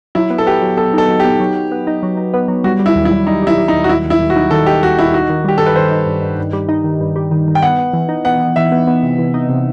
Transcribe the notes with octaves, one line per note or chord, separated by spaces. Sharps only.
F#3 E4
B3
A4
B3 G4
F#3
B3 A4
D#4 A4
F#3
B3 G4
F#3
F#3
B3
D#4
F#3
D#4
B3
F#3
G3 F#4
G3
E4
D#2
E4
G3
G3 D#4
G3 E4
G3
D#4
D#2
F#4
D#2 E4
D#2
E4
D#2
F#4
D#4
D#3 A4
D#4 G4
D#2 F#4
D#4 E4
D#4 F#4
D#3
G3 G4
G2 A4
B4
D#3 C5
D#4
G2
G2
G2
G3
D#4
D#3
G2
G3
D#3
D#3
G5
B3 F#5
B3
E3
D#4
B3 F#5
B3
E3 E5
B3
B3
C3
E3
D#4
C3